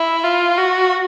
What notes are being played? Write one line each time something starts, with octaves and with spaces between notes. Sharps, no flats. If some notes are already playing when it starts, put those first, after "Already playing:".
Already playing: E4
F4
F#4